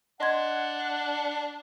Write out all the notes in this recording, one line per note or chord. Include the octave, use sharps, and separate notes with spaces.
D4 D#5 F#5 C6 G#6